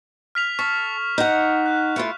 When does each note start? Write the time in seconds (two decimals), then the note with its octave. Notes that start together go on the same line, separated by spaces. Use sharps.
0.35 F6 B6 F7
0.59 A4 C#6 B6
1.18 D#4 F#5
1.66 F#6
1.96 A3 E4 F4